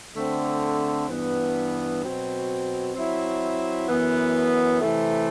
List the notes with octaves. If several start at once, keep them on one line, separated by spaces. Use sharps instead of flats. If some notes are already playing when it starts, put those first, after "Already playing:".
D3 A3 C4
G2 E3 B3
B2 F#3 C4
F#3 C4 E4
F#2 E3 B3
C3 E3 A3